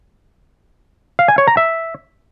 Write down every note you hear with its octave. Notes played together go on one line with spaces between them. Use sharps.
F5
G#5
C#5
A#5
E5